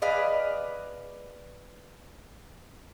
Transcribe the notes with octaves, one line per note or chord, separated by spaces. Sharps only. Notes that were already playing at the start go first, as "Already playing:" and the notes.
G#4 B4 D5 D#5 F5